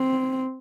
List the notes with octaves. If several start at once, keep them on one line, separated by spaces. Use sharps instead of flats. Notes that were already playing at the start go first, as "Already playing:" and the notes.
Already playing: C4